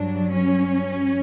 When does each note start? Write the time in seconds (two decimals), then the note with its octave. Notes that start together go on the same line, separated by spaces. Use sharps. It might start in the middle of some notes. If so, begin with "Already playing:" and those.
Already playing: G2 F#3 D4
0.31 C#4